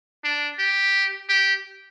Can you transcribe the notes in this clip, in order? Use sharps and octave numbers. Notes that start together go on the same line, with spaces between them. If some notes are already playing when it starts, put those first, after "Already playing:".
D4
G4
G4